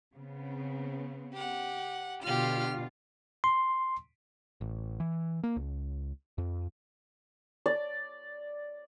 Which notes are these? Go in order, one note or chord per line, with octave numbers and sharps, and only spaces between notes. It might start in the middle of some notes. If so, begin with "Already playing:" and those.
C#3 B3 C4
G4 F#5
B2 D3 F4 G4 F6
C6
A1
E3
A#3
C#2
F2
D5